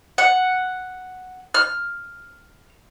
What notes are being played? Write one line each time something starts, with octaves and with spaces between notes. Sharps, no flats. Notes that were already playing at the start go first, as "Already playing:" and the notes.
F#5
F6